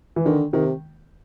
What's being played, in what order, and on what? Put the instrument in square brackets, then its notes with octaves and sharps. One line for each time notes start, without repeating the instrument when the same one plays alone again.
[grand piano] E3
[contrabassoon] D3 [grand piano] D#3
[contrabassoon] C3 [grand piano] D#3